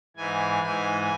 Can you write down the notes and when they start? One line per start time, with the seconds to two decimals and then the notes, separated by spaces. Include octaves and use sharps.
0.17 G#2 E3 G#5
0.62 G#2 E3 G#5